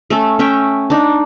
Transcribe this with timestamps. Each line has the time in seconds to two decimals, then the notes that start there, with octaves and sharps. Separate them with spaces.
0.10 A3 C#4 A4
0.39 C#4 E5 G5
0.90 D4 D#4